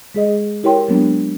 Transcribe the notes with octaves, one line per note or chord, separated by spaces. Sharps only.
G#3 G#4 D#5
E4 G4 A#4 C#5 G5 C6
F#3 G#3 A#3 B3 D4